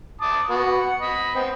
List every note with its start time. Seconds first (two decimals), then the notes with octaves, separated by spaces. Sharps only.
0.21 A5 D6 D#6
0.50 B3 F#4
0.79 F#5
1.01 D#5 B5
1.35 B3 C4